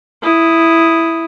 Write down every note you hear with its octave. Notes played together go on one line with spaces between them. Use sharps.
E4 D#6